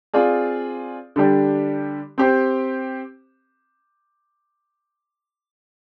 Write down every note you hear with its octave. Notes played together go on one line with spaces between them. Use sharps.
C4 F4 G#4 D5
D3 G3 D4 G4
C4 G4 C5